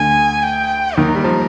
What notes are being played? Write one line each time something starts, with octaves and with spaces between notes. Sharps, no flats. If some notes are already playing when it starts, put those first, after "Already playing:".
Already playing: D2 D3 G#5
G5
D#2 D#3 A#4
G3
F3